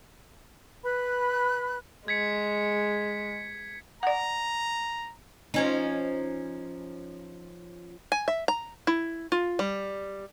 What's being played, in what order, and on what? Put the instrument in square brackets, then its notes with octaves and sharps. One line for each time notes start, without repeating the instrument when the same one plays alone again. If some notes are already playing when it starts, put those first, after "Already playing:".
[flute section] B4 B5 F#6
[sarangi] G#3 [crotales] G#6 B6 C#7
[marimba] D5 F#5 [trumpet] A#5
[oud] F3 C#4 D#4
[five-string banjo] G#5
E5
A#5
E4
F4
G3